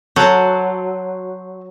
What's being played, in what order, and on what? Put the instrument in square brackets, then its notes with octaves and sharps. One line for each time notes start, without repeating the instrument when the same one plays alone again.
[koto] F#3 [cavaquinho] F#4 A4 C5